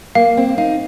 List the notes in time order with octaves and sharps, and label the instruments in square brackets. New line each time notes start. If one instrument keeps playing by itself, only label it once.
[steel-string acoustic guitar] A#3 [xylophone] F5
[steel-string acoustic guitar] C4
[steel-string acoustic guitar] D#4 [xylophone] F5